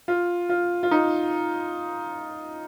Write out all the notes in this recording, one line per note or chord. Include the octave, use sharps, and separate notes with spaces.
F4
F4
F4
D#4